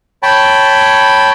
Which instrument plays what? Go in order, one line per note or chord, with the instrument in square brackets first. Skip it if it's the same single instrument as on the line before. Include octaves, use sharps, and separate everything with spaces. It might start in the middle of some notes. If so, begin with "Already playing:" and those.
[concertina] C#5 G5 A5 B5